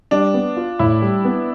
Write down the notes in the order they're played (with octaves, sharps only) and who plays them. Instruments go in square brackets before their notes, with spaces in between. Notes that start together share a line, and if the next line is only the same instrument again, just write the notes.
[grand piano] G3 [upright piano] D4
[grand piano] B3
F4
[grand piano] A2 [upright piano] E4
[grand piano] G3
B3